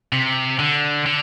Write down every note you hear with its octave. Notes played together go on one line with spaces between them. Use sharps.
C3
D3
D3